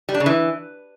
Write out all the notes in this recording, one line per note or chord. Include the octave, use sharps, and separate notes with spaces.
G3
D4
C#3
E3